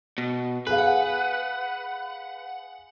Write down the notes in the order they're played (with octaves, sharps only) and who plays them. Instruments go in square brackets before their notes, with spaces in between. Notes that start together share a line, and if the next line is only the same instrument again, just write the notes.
[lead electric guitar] B2
[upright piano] G#4 F5 [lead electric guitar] B4
[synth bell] F#5